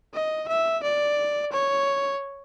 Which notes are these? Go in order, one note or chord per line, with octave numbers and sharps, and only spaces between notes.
D#5
E5
D5
C#5